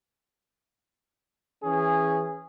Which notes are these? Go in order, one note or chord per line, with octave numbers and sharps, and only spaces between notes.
E3 C#4 G#4